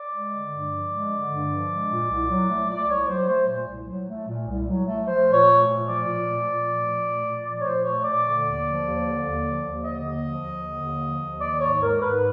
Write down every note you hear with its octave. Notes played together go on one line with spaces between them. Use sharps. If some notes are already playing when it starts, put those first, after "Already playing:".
Already playing: D5
G#3
D3
G2
F3
G#3
D3
G2
F3
G#3
A#2
C2
F#3
A3
A#2 D5
C2 C#5
F#3 C5
A3 C5
A#2
C2
F#3
A3
A#2
C2
F#3
A3
F3 C5
A#2
C#5
A3
A#2
F3 D5
A#2
A3
A#2
F3
A#2
A3
A#2
F3 D5
C#5
A#2 C5
A3 C#5
A#2 D5
D3
D#2
F3
D#2
D3
D#2
F3
D#2
D3 D#5
D#2
F3
D#2
D3
D#2
F3
D#2
D#3 D5
G#2 C#5
G#3 A#4
G#2 B4